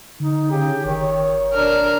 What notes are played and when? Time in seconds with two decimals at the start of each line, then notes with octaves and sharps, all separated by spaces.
0.20 D3 D#4
0.51 C#3 G4
0.85 G1 D#3 C#5
1.53 B2 D4 A#4